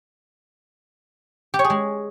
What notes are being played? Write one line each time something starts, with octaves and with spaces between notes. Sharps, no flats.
G4
C#5
G#4
G#3